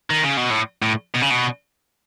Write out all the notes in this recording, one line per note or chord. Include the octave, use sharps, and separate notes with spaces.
D#3
C#3
B2
A2
A2
B2
C#3
B2